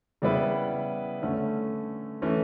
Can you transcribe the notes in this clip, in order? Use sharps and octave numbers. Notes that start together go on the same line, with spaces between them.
C#3 G3 B3 E4 B4
D3 A3 C#4
E3 A3 C#4